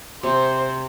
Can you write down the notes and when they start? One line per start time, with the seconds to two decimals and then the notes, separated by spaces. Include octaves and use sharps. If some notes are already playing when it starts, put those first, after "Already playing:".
0.23 C3 C5